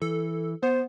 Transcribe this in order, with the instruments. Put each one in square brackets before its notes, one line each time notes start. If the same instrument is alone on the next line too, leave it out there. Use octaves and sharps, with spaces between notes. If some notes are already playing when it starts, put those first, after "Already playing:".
[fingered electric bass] E3 [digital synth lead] A4
[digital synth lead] B3 [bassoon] C5